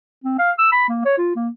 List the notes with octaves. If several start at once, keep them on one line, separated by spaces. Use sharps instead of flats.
C4
F5
E6
B5
A#3
C#5
F4
A#3